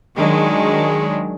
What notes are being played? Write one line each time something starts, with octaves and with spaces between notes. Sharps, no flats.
D#3 F#3 G#3 D4